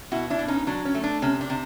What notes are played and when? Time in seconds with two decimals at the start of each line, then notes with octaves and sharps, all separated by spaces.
0.12 B2 E4 F#4
0.30 D4 E4
0.39 B2
0.48 C#4 D#4
0.67 F#3 D4
0.85 C#4
0.95 A3
1.04 D4
1.22 C3 C#4
1.41 D4
1.50 C3